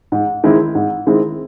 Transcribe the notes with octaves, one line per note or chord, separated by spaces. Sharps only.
G#2
D#3 G#3 C4 E4
G#2
D#3 G#3 C4 E4